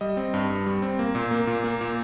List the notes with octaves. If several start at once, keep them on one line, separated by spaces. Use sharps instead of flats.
G3 D#5
C4
G2
G2
G3
C4
A#3
A#2
A#3
A#2
A#3
A#2